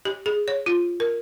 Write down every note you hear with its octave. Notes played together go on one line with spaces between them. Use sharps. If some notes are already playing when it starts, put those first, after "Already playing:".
G4
G#4
C#5
F4
A#4